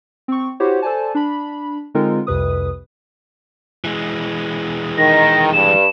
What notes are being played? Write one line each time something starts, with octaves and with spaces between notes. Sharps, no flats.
C4 C#6
E4 F#4 G4 C5 C#5 F#5
A4 C5 D5 G#5 A5
D4 B5
D3 G#3 C4 D#4 F4 A#4
C2 F2 C3 B4 D#6
E3 G#3
D#3 A#6
G2 E7